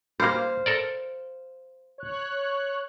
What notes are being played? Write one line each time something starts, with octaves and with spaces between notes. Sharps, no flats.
G3 A#3 C5 F5
A4 A#4 D5
C#5 F#6